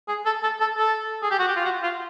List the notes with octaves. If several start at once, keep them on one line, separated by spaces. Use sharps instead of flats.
G#4
A4
A4
A4
A4
G#4
G4
F#4
G4
F4
F#4
F4